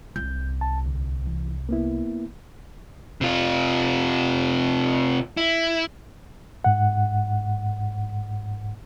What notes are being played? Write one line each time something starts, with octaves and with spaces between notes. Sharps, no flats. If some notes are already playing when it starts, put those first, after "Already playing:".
C2 G6
A5
D2
E3
A#3 B3 E4
C3 F4
E4
G#2 F#5